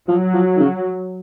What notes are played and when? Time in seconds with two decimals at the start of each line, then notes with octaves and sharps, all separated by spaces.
0.08 F3 F#3
0.34 F3
0.57 D#3
0.60 C#3